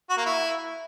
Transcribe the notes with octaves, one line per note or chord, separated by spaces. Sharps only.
F#4
A#3
E4